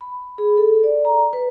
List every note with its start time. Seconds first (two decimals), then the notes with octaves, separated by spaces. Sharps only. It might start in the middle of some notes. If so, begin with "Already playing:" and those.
0.01 B5
0.38 G#4
0.57 A4
0.84 D5
1.05 A#5
1.33 B4